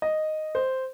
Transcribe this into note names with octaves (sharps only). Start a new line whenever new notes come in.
D#5
C5